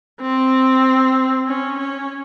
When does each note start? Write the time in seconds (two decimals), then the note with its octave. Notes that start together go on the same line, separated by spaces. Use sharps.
0.21 C4
1.47 C#4
1.79 C#4